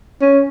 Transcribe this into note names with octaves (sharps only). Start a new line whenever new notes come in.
C#4